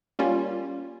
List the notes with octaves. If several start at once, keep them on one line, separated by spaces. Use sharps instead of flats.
G3 A#3 C#4 F4